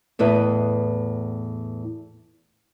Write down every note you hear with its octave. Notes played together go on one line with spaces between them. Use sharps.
E2 A2 E4 B4 D#5